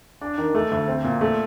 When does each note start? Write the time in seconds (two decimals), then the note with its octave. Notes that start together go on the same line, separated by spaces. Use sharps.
0.21 D4
0.38 D#3
0.55 A3
0.71 D2
0.88 C4
1.04 A#2
1.21 A3